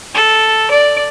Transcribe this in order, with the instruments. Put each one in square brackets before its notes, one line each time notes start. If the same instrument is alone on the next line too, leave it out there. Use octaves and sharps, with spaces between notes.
[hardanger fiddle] A4
D5